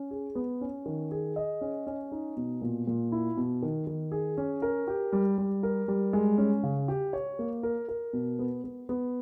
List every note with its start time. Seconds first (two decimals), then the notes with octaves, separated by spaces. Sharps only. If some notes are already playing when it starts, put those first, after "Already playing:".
Already playing: C#4
0.11 G#4
0.35 B3
0.61 C#4
0.86 D#3
1.11 G#4
1.36 D#5
1.61 C#4
1.87 C#4
2.12 D#4
2.37 B2
2.62 A#2
2.87 A#2
3.12 E4
3.37 B2
3.62 D#3
3.87 D#3
4.12 G#4
4.38 C#4
4.62 A#4
4.87 G4
5.12 G3
5.38 G3
5.63 A#4
5.88 G3
6.13 G#3
6.38 C#4
6.63 C#3
6.88 G4
7.13 C#5
7.39 A#3
7.63 A#4
7.88 A#4
8.13 B2
8.39 B3
8.64 B3
8.89 B3